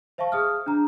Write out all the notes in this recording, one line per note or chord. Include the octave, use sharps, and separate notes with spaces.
C5 E5 F5 A5 C#6
G#4 D#6 F6
D4 A#5